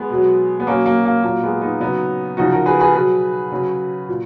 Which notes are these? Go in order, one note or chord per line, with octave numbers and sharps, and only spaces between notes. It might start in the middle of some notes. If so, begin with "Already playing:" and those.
Already playing: G#3 B3
B2 F#3
B3
B2 F#3 A#3 C#4
A#3
A#3
A#2 F#3 A#3
G#3 B3
B3 D#4
C#3 F#3 B3 D#4
C#3 F3 D#4 F#4
F#4 A#4
G#4 B4
G#4 B4
B2 F#3 G#4 B4
C#3 F#3
A#2